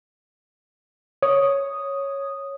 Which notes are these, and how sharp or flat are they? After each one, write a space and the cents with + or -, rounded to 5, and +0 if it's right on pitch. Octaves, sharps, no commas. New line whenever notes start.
C#5 +0 D#6 +0